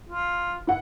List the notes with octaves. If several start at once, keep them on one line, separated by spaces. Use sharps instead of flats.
F4
E4 F#5